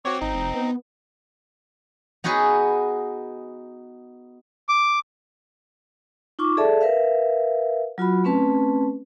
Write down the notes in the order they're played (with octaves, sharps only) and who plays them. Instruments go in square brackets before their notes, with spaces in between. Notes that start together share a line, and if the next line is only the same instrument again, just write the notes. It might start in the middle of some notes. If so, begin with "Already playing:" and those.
[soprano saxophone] C4 [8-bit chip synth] F#4 C#5 [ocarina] D6
[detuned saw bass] G#1 [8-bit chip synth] D#4 [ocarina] A#5
[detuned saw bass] F1
B3
[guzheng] B3 D#4 F#4 G#4 B4
[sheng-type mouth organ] D6
[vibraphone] D#4 F4 C#6 D6
G#4 A4 D5 E5 A5
A#4 B4 E5 F5
F#3 F4 F#4 B5
A3 C4 C#4 B4 A5